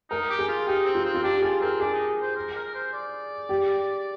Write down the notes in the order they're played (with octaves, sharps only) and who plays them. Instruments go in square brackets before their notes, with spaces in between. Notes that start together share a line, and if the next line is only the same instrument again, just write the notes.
[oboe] D#4 [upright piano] A#4
[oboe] G4
[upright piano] G#4
[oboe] F4
[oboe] D#4 [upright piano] G4
[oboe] C4
[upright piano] F4
[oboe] C4
[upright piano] F4
[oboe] D4 [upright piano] G4
[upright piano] G4
[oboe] F4 [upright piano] G#4
[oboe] C4 [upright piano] A#4
[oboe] D4 [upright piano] G#4
[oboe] D#4
C5
A#4
A#4
C5
D5
[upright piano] G4